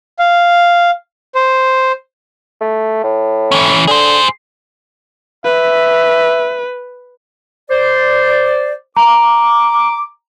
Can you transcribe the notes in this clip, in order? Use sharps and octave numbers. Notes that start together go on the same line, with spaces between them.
F5
C5
A3
A2
E3 C#4
D3 G#4 C5
B4 E5
C5 D5
A#5 D6